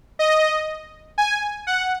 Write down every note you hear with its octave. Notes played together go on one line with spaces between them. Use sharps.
D#5
G#5
F#5